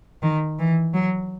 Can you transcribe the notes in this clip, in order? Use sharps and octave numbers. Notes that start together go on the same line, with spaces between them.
D#3
E3
F#3